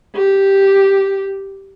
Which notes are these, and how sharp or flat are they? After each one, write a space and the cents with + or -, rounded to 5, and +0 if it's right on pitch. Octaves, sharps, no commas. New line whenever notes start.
G4 -5